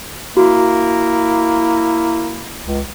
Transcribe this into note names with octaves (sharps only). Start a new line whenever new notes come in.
A#3 E4 F#4
C#2